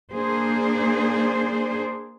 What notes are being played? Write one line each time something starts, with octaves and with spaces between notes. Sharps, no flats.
A#3 D4 G#4 C5